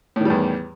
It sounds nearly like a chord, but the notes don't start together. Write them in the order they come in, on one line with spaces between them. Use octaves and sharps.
A2 D#3 G3 E2